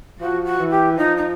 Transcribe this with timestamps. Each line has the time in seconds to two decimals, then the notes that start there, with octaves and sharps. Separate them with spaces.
0.19 F3 F#4
0.45 F#4
0.58 E3
0.71 G4
0.97 F3 D#4
1.17 D#4